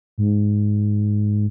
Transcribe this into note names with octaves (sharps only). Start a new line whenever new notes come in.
G#2